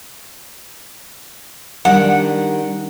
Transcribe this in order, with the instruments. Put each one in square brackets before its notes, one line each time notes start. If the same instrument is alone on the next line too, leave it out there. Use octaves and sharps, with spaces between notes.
[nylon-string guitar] D#3 G3 D4 [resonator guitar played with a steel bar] F#5